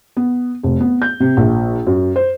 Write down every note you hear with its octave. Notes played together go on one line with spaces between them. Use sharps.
B3
F1
B3
G6
C3
A#1
F#2
C5